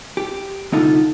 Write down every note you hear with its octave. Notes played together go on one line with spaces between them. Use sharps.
G4
C2 D3 D#4 F4 A4